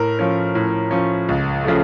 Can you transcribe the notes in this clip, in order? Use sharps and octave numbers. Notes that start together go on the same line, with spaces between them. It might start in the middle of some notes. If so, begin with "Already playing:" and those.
Already playing: A2 A#4
F3 C#4
A2
F3 C#4
C#2
C#3 F3 A3